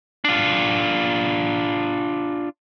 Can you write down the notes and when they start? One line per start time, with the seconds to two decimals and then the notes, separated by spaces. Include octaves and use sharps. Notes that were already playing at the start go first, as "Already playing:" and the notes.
0.25 D4 F4